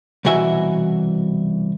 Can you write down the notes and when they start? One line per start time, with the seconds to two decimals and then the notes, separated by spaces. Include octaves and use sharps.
0.25 C2 B2 E3 F#4 E5 G#5